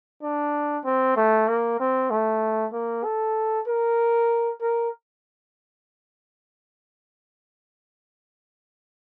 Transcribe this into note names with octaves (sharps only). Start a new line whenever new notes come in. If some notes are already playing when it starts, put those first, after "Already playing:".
D4
C4
A3
A#3
C4
A3
A#3
A4
A#4
A#4